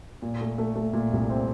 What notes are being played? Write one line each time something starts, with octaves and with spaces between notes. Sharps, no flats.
A#2
A3
A3
A3
A#2
C2
C4